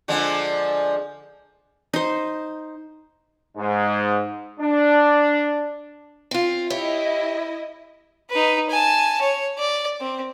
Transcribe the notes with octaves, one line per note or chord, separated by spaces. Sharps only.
D3 F3 G#3
D#4 C5
G#2
D4
C4 F4
E4 G4 C#5 D#5
D#4 B4
G#5 A5
C#5
D5
C4